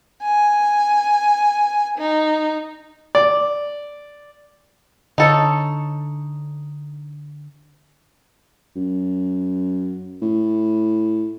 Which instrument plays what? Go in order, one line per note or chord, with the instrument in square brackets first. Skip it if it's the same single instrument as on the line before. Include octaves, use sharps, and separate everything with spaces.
[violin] G#5
D#4
[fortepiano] D5
[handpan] D3 [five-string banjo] D#4 A4 C#5
[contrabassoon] F#2
A2